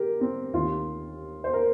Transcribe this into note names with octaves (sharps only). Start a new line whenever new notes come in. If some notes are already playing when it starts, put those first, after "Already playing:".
Already playing: G4 A#4
C4
D#2 D#3 F4
C5
A#4